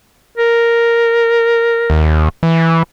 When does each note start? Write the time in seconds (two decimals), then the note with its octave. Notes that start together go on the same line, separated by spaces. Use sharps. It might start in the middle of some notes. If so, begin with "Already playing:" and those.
0.37 A#4
1.90 D#2
2.43 E3